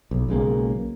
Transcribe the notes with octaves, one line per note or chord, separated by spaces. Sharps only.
B1
B1 C#3 G#3 A#3